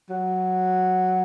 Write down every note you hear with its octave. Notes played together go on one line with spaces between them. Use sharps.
F#3